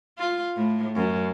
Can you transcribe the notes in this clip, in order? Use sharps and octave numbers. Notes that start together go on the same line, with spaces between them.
F4
A2
F#2